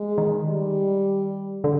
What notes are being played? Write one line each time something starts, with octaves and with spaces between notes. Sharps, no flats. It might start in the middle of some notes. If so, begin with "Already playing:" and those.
Already playing: G#3
D#3
G3
D3